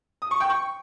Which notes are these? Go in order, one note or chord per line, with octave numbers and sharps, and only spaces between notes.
D#6
C#6
G5
C#6